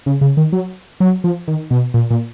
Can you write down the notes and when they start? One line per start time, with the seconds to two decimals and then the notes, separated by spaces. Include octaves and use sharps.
0.06 C#3
0.21 C#3
0.37 D#3
0.52 F#3
1.00 F#3
1.24 F3
1.47 D#3
1.71 B2
1.94 A#2
2.10 A#2